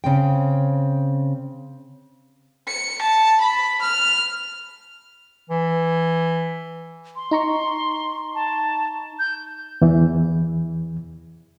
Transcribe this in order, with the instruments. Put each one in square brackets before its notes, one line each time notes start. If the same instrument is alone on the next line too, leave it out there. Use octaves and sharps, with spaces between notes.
[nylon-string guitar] C#3 C4 G5
[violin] C#7
A5
B5
F6
[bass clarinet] E3
[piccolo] C6
[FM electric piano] D#4 A#5 C#6
[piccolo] A5
G6
[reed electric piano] E2 E3